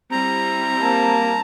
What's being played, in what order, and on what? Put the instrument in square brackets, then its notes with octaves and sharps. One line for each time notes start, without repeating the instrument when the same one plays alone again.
[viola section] G3 C4 E4 [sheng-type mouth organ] A#5
[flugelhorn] A#3 [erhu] A5